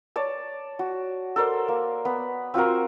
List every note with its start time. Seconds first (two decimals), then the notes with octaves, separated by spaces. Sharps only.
0.16 C#5 D5 A5
0.79 F#4
1.36 A4 A#4 C5 D5
1.68 A#3
2.05 B3 B4
2.54 C4 F4 F#4 A#4